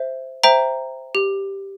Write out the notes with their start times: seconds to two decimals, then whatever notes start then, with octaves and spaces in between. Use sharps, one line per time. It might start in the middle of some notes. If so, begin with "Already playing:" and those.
Already playing: C5 E5
0.44 C5 E5 G5 A#5
1.15 G4